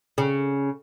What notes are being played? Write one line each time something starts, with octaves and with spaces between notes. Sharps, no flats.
C#3